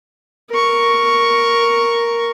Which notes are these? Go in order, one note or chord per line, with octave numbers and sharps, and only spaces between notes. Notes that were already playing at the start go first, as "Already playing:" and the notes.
A#4 C#6